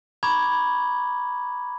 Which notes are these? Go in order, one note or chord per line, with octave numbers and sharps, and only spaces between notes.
A#5 B5 C#6 D6 G#6